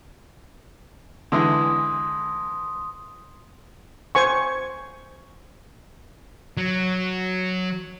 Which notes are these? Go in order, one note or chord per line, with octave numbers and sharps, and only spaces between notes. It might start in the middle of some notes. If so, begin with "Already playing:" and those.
D3 E3 G#3 C6 D#6
C5 G#5 C#6
F#3